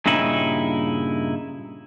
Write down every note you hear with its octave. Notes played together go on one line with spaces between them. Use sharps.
G2 A#2 C#3 D#4 E4